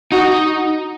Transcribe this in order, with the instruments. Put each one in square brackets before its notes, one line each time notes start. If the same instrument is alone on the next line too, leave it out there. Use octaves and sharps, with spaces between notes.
[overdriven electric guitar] D#4 [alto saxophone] F#4